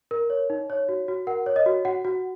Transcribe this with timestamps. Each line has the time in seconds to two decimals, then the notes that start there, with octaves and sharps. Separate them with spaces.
0.11 A#4
0.30 C#5
0.50 D#4
0.70 C#5
0.89 F#4
1.08 F#4
1.27 A#4 F#5
1.46 C#5
1.56 D#5
1.66 F#4
1.85 F#4 F#5
2.05 F#4